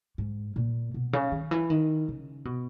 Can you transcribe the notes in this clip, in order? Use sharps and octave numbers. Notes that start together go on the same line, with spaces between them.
G#2
A#2
B2
C#3
D#3
E3
D#3
C#3
B2